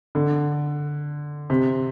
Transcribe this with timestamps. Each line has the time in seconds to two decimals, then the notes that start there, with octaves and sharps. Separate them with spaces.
0.15 D3
1.50 C3